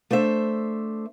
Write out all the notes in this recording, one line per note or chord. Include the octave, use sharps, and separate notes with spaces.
A3 D4 C5 E5